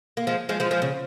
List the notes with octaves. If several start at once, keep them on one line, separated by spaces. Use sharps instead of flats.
A#3
F3 G#3
F3 G#3
F3 G#3
F3 G#3
C#3